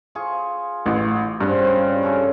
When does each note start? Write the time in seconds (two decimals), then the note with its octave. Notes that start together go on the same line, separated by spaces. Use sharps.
0.15 F4 G#4 C#6
0.86 A1
1.40 G2 C#3 C4 C#5
2.03 C#4 A4 A#4